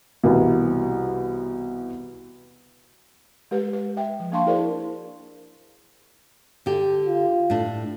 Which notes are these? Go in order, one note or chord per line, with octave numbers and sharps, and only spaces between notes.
C2 B2 E3
G#3 G4 B4
B4
E5 G5
F3
A#3 D4 F5 A5 C6 C#6
E4 F#4 G#4 A#4 C5 D5
D3 G4
F4
A2 D4